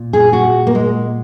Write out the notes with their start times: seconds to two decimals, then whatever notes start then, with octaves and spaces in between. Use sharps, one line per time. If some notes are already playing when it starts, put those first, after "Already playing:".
Already playing: A#2
0.13 G#4
0.33 F#4
0.67 A#3
0.75 G#3